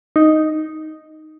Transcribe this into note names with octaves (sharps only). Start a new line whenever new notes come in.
D#4